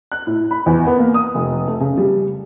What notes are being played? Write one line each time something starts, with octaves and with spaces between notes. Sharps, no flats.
F#6
A2
B5
E2
B3
A#3
D#6
F1
A3
C#3
G3